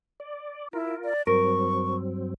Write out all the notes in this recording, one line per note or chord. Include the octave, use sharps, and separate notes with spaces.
D5
E4 F4 A#4
D5
G2 F#3 C4 A#4 C#6